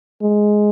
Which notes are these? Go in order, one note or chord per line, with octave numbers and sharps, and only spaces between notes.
G#3